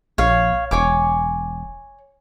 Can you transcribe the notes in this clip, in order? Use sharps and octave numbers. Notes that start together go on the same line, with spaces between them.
A#1 C#5 F5
E1 C#5 G#5 D6